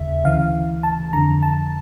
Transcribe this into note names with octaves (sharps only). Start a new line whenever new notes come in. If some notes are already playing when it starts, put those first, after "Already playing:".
Already playing: D#2 C#3 E5
D2 C#3 E3 F5
A5
F2 D3 A#5
A5